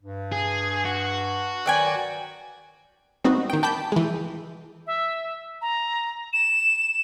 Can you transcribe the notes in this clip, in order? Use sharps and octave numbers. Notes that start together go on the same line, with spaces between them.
G2
G#4
F#4
D#3 F#3 B4 D5 G5 G#5
G3 B3 C4 D#4 F#4
D#3 G5
G5 A5 B5 D6 G6
E3 G#3
E5
A#5
E7